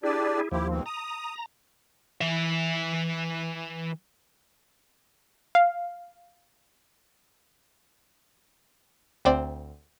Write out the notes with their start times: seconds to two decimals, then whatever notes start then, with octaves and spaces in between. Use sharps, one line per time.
0.03 D4 E4 G4 G#4 D5
0.52 D#2 F3 E4 G4
0.69 G#2 B2 C4
0.86 A#5 D#6
2.21 E3 E5
5.55 F5
9.25 D2 C4 D5